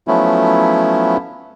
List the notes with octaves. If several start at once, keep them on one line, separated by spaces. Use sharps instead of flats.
F3 F#3 A3 B3 C#4 E4